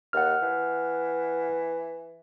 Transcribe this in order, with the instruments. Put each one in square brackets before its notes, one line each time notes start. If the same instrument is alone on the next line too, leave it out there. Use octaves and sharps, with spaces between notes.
[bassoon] D#2 [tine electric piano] F#5 F6
[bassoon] E3